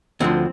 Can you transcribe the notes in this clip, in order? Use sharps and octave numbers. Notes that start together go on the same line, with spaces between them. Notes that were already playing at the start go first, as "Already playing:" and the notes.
D2 D3 F3 C4